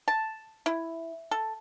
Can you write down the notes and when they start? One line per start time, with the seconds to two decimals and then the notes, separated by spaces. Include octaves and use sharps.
0.08 A5
0.66 E4
1.31 A4